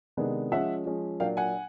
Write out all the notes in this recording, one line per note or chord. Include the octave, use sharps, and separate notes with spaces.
C3 D#3 G#3 B3 D4
F3 G#3 C#4 E5 F#5
F3 G#3 C#4
A#2 F#3 A#3 D4 F5 G5
F#5 G#5